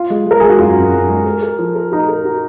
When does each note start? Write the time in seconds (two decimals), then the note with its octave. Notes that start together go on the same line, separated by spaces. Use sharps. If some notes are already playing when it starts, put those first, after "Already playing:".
Already playing: F4
0.10 G#3
0.26 G#3 A#4
0.40 G#3 G#4
0.49 F#4
0.59 F#2 F4
0.77 F#2
0.93 F#2
1.09 G#3
1.26 A#4
1.43 A#4
1.58 F3
1.75 A#4
1.92 D#4 F#4
2.09 A#4
2.25 F#4